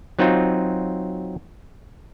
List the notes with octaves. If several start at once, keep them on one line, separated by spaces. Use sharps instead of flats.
F#3 C4 D#4 F4